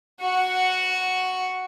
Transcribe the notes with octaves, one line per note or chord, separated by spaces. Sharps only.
F#4 F#5